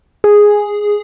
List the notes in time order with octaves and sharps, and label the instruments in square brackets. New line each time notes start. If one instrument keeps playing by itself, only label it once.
[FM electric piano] G#4